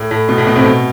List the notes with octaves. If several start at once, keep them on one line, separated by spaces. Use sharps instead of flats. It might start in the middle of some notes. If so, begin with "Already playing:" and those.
Already playing: A2
A2
B2
A2
B2
A2 C3
B2